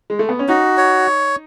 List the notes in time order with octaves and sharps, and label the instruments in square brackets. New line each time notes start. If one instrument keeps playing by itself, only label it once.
[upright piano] G#3
A3
B3
C#4
[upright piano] D#4 [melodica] F#4
[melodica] C#5